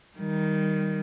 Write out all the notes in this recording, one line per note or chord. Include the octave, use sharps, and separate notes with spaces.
D#3 G3